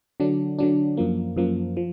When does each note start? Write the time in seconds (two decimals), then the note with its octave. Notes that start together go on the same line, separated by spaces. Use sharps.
0.20 D3 F#3 D4
0.59 D3 F#3 D4
0.97 F#2 F3 A#3
1.36 F#2 F3 A#3
1.77 F3